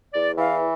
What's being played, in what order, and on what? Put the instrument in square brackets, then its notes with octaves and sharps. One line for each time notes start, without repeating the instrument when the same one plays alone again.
[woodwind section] E2 D5
E3 F5